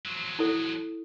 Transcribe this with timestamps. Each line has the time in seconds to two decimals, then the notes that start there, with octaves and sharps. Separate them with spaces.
0.05 F3 F#3
0.39 E4 A4